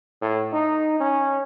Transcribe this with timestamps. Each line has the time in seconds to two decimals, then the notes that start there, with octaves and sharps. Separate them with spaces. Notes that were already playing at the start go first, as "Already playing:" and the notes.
0.21 A2
0.53 D#4
1.00 C#4